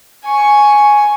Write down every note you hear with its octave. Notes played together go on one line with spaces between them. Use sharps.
G#5 C#6